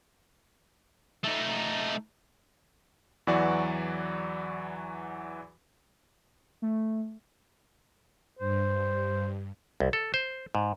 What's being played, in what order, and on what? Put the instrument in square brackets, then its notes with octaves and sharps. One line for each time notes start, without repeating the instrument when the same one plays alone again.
[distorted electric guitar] A3 D#4
[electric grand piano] E2 E3 F#3 F#4 D5
[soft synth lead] A3
[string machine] G2 [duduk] C5
[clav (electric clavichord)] C2
A4
C5
G#2